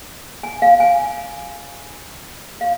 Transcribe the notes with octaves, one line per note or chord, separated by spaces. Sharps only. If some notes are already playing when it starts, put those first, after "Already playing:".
G#5
F5
G#5
F5